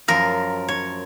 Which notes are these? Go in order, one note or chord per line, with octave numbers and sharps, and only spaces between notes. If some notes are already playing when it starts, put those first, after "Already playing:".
F#2 F3 A#4
C#5